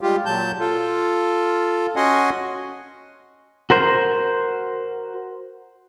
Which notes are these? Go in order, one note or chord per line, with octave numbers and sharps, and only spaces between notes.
G3 G#3 F4 G4
A#2 F#3 A5 G6
F4 A4
C#4 F#4 D#5 F#5 G#5 C6
F#4 A#4 C5